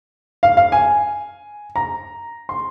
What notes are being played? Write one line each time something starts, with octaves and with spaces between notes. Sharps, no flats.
F5
F5
G#5
A#5
C6